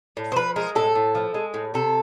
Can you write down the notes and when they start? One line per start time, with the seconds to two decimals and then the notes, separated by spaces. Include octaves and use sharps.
0.17 A2
0.32 C5
0.36 F3 B4
0.56 G#3 A#4
0.75 A2 A4
0.95 A2
1.15 F3
1.34 G#3
1.54 A2
1.74 C3 A4